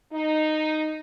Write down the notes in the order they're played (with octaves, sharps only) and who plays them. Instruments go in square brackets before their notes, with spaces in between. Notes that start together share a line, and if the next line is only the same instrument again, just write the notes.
[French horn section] D#4